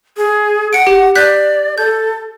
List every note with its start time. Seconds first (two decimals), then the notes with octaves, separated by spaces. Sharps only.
0.17 G#4
0.73 F#5 C#7 D7
0.87 G4
1.15 D5 F#6 G6 B6
1.78 A4 G6